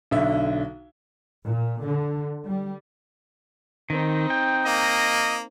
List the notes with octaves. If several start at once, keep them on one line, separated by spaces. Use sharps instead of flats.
B1 D3 E5
A#2
D3
G3
D#3 C4 D#4
G5
A#3 D#5